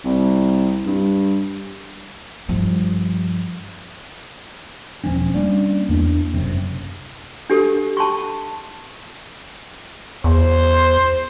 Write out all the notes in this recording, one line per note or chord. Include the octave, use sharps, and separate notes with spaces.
C2
G2
G2 F3
E1 F3 C4 C#4
G3 A#3 C#4 D4
E2 A#3 D4
F#1 F#2 C3
D4 G4 A4
A5 C6 C#6
E2 C5